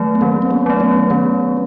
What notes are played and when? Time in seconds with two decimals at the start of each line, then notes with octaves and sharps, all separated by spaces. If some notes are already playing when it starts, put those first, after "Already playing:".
Already playing: D#3 F#3 A3
0.15 B3
0.21 D#3 A#3 C4
0.42 C4
0.50 B3 C#4
0.66 F#3 A3
0.80 B3 C#4
1.10 D#3 B3 C#4